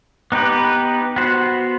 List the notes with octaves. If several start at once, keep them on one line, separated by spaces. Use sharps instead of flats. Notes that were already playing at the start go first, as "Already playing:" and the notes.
B3 D#4 G4 B4
B3 F#4 C5